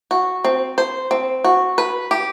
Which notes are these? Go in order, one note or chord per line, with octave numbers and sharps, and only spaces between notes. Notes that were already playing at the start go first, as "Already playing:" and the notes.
F#4
C4
C5
C4
F#4
B4
G4